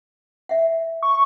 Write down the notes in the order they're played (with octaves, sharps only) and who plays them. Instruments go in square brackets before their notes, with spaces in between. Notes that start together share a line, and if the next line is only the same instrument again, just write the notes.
[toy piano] E5 F#5
[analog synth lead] C#6